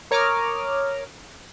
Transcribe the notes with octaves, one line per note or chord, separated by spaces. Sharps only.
A#4 C#5 A#5 D6 D#6 F6